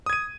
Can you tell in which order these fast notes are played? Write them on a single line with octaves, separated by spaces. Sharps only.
D#6 G#6 D#7